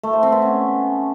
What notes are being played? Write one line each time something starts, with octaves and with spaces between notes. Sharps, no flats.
A3
C5
C4
B3
C#4